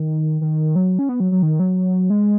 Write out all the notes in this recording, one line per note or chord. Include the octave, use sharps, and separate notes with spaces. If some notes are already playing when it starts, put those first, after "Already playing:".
Already playing: D#3
D#3
F#3
C#4
B3
F#3
F#3
D#3
F#3
G#3